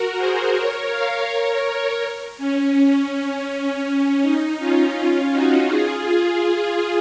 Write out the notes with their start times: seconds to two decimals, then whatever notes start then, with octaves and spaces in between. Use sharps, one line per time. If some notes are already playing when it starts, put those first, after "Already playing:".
Already playing: F#4 A#4
0.17 G#4 C5
0.54 A#4 C#5
0.91 C#5 F5
1.28 A#4 C#5
1.65 A#4 C#5
2.38 C#4
3.12 C#4
4.22 D#4
4.59 C#4 F4
4.96 C#4 F4
5.33 D#4 F#4
5.69 F4 G#4
6.06 F4 G#4